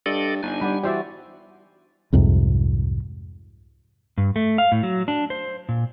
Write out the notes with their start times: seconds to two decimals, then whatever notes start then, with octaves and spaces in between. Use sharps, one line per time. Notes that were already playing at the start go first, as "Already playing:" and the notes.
0.06 G2 A4 D5 D#5
0.43 G1 D4 D#4 G#5
0.61 G3 D5 F#5 B5
0.83 E3 F#4 G4 C5 D5 E5
2.13 C2 F2 G#2 C3
4.18 G2
4.36 A3
4.58 F5
4.72 A2
4.83 F#3
5.08 D4
5.30 C5
5.69 A#2